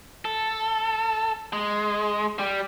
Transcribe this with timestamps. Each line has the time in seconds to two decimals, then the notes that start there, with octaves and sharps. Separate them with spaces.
0.25 A4
1.53 G#3
2.39 G3